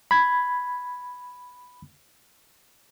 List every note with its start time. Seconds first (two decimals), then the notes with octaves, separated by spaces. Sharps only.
0.11 B5 G#6